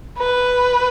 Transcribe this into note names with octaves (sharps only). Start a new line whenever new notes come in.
B4